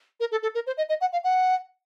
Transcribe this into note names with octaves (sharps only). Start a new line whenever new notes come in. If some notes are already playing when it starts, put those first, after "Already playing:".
A#4
A4
A4
A#4
C5
D#5
D#5
F#5
F5
F#5